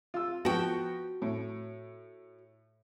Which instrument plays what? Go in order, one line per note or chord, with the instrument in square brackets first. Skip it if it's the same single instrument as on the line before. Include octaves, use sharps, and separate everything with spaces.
[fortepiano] F4 E6
[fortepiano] F3 B3 C#6 [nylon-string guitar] F#4 G5
[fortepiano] A2